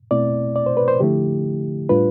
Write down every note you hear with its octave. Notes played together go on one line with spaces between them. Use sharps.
B2 A3 C4 E4 D5
D5
C5
B4
C5
D3 F3 A3 E4 G4
A2 G3 D4 F4 B4